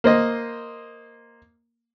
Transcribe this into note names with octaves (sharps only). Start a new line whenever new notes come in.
A#3 C5 D#5